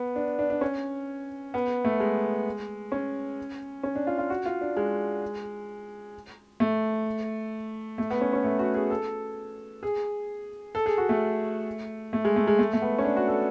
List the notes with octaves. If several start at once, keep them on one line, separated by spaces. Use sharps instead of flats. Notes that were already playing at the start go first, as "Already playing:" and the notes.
Already playing: B3
D4
D4
D4
C#4
B3
A3
G#3
C#4
C#4
D4
F4
F4
F#4
F4
D4
G#3
A3
A3
B3
C#4
C#4
A3
F#4
G#4
A4
G#4
A4
G#4
F#4
A3
A3
G#3
A3
G#3
A3
A3
B3
C#4
D4
F#4
A4